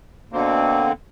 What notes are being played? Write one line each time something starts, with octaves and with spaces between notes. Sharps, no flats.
B2 D3 A#3 C4